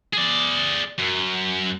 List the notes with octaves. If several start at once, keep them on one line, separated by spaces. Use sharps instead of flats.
G#4 D5
F#2